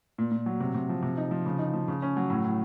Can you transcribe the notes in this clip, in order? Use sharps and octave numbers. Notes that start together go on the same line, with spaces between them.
A#2
A#2
F#3
C3
C3
F3
C3
D#4
F3
C#3
D#4
F3
C#3
C#4
F#3
A2
A2